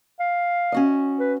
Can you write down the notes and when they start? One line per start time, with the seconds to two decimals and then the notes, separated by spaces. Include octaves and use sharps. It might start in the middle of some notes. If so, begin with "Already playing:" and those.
0.20 F5
0.72 C#4 F#4 D#5
1.19 B4